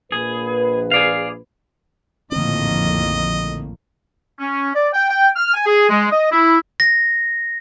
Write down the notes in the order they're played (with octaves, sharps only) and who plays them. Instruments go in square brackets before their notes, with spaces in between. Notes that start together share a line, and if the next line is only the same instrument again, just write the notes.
[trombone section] A#1 B4 [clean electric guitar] G#4
[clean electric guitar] G#4 D5 F5
[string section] A#1 F2 A2 [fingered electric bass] D3 C4 [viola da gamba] D#3 A#3 [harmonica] D#5
[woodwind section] C#4
D5
G5
G5
F6
G#5
G#4
G#3
D#5
E4
[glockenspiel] A#6